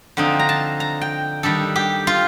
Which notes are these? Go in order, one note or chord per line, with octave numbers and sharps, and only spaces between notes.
D3 F3 C4 D#4
A#5
A5
A#5
G5
D#3 G3 D4 A4
G4
F4